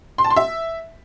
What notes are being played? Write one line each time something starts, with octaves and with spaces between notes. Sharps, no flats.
C6
A5
C6
E5